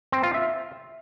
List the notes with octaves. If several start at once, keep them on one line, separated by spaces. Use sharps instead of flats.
C4
F4
E5